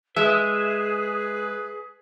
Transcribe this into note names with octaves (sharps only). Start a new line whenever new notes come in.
G#3 G#4 B4 E5